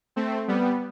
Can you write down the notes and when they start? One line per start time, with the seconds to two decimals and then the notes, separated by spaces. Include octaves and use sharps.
0.16 A3 C4
0.48 G3 B3